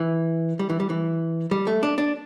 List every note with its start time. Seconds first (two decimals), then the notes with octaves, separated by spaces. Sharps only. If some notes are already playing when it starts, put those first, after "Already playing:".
Already playing: E3
0.59 G3
0.70 E3
0.80 G3
0.90 E3
1.51 G3
1.67 A3
1.83 D4
1.98 D4